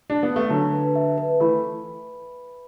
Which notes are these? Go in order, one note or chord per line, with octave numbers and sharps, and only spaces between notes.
D4
B3
A3
D3 F#3 A5
B4
E5
B4
E3 A3 B5